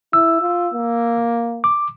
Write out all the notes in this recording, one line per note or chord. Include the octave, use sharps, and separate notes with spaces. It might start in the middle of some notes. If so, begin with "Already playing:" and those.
E4 E6
F4
A#3
D6